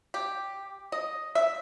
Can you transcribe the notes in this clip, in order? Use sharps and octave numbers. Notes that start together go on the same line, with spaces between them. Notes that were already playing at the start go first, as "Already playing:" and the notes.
G4
D#5
E5